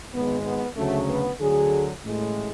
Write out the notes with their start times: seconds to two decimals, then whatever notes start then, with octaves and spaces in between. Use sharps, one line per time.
0.13 G#1 G#2 G#3 B3
0.45 B3
0.77 D2 C#3 F#3 A3
1.08 B3
1.40 D2 D3 F#3 G#4
2.04 A1 A2 G#3